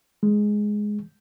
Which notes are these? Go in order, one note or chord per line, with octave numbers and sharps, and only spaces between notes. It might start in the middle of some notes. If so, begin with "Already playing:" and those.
G#3